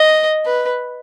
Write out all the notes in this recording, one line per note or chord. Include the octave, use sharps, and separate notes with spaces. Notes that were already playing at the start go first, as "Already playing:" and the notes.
Already playing: D#5
B4